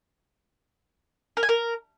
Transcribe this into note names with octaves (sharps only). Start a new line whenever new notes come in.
A#4
G#5
A#4